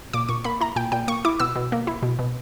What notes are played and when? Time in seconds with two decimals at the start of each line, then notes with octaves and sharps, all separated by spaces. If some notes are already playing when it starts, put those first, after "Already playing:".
0.13 A#2 D6
0.29 A#2 C#6
0.44 A#3 B5
0.61 E4 A#5
0.76 A#2 G5
0.92 A#2 G5
1.08 A#3 C#6
1.25 E4 D6
1.40 B2 E6
1.56 B2
1.72 A#3
1.87 E4
2.03 B2
2.19 B2